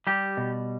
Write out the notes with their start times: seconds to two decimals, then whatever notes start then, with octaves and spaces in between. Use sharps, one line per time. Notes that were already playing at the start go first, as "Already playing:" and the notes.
0.07 G3 G4
0.37 B2